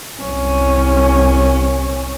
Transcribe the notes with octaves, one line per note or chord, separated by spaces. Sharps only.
C2 C#4